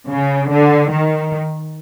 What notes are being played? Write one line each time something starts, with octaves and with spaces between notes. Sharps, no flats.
C#3
D3
D#3